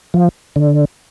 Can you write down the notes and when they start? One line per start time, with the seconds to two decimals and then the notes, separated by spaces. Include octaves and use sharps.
0.14 F3
0.56 D3